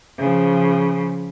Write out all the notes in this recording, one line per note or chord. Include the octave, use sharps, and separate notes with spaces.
C#3 F3